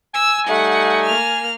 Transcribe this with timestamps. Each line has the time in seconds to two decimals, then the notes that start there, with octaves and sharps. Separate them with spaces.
0.14 G#5 E6
0.47 G3 A3 D#4 F#5
1.05 A#3 F6